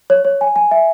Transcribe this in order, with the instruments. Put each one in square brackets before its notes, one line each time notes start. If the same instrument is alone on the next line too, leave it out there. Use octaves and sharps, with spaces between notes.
[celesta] C#5
C#5
G#5
G#5
E5